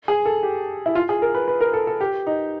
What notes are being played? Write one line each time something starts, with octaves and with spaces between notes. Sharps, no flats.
G#4
A4
G4
E4
F4
G#4
A#4
B4
B4
A#4
A4
A4
G4
D#4